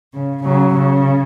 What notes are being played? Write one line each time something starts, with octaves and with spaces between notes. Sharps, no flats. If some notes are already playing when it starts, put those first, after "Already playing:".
C#3
C#3 F#3
C#3